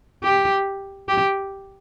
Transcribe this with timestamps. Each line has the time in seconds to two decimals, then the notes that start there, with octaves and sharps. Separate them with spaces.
0.23 G4
1.08 G4